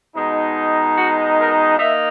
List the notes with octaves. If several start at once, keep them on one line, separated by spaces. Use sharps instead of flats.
B2 G#3 D#4
F#4
A#4
A#3 D#4 E5